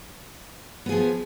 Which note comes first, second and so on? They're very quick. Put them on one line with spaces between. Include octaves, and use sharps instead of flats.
B3 G#4 F3